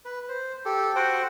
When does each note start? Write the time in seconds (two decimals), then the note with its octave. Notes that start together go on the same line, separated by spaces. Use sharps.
0.05 B4
0.28 C5
0.65 G4 A4
0.96 F#4 C5 F#5 G5